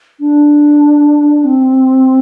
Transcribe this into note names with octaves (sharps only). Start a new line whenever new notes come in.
D4
C4